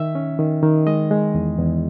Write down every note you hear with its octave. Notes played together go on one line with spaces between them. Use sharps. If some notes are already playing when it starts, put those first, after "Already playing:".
Already playing: D#3 E5
C#4
D#3
D#3
G#3 D#5
G#3
E2
E2